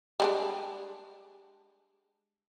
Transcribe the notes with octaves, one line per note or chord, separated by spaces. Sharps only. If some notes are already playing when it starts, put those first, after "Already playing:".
G3 G#3 D4